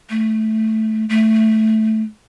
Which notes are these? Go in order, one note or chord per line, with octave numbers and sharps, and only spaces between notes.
A3
A3